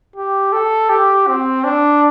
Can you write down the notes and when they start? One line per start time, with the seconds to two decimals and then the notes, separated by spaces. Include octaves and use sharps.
0.16 G4
0.52 A4
0.89 G4
1.28 C4
1.64 D4